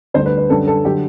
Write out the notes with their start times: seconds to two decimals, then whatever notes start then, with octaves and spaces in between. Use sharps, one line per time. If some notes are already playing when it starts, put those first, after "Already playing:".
0.14 D2 D3 G3 C5
0.26 B4
0.37 B4
0.49 F#2 D3 G3 A4
0.67 A4
0.84 D3 F#3 G4